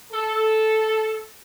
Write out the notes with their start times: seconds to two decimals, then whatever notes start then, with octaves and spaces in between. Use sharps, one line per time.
0.12 A4